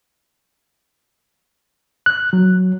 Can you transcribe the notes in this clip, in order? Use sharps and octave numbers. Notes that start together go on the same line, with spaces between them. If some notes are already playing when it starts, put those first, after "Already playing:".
F#6
F#3